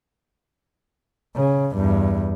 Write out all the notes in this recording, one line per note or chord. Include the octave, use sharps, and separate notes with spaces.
C#3
E2 G2